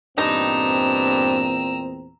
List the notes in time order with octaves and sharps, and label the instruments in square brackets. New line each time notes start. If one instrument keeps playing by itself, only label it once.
[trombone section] E2 A#2 C4 [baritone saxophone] G2 [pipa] D#4 [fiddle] A#5 E6